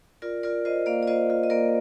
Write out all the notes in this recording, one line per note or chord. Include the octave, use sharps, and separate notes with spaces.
F4 A#4 D5
F4 A#4 D5
F4 C5 D#5
A#3 D5 F5
D5
F4 C5 D#5
F4
D#5
A#3 A#4 D5